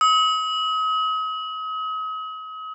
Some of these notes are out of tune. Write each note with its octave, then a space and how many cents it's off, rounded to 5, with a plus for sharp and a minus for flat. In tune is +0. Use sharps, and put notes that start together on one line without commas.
D#6 +40